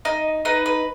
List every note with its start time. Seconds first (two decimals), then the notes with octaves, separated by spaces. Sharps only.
0.05 D#4 D#5
0.45 D#4 B4
0.66 B4